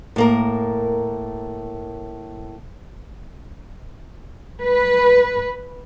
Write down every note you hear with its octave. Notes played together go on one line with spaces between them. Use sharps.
A2 A#3 A#4
B4